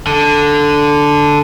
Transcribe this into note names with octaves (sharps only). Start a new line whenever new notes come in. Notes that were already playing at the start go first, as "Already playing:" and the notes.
D3